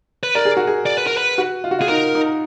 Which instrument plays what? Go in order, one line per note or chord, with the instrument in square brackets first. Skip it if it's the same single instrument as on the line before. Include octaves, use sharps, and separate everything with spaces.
[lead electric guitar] B4
[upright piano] A#4 [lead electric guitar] D5
[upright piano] G#4
F#4
G#4
[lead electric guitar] D5
B4
A#4
B4
[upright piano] F#4
F4
F#4
[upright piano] F4 [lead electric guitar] G#4
[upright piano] D#4 [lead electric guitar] A#4
[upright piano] D#4